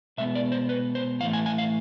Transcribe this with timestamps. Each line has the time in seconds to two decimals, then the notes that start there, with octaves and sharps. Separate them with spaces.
0.18 B2 G#3 B3 E5
0.35 D5
0.52 C5
0.69 B4
0.95 C5
1.20 A2 E3 A3 F5
1.33 G#5
1.46 G#5
1.58 F5